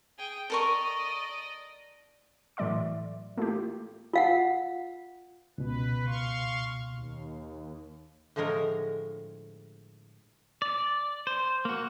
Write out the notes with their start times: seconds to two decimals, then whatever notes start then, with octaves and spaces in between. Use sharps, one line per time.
0.18 G#4 G5
0.50 A4 A#4 D5 D#5 C#6
2.57 A2 E3 F#3 D5 E5 C6
3.37 A3 A#3 E4 F4 G4
4.13 F4 F5 F#5
5.58 C#2 B2 B4
6.06 F5 C6 C#6
6.85 D#2
8.36 A2 D3 F3 G#3 A#4 C#5
10.62 D5
11.27 C5
11.65 A#3 F#4